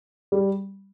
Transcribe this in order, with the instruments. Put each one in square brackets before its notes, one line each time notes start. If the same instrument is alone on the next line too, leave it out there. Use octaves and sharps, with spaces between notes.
[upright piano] G3